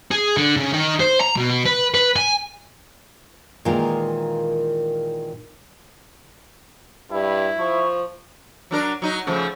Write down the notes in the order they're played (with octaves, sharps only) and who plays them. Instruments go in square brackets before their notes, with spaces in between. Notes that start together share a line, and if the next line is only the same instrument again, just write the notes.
[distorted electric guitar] G#4
D3
C#3
D#3
C5
A#5
B2
B4
B4
G#5
[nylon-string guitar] A#2 D#3 E3 G#3 F4 A#4
[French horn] G2 [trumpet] E4
[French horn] F3 [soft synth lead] C#6
[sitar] F#3 D4 A#4
F#3 D#4
C#3 F3 A3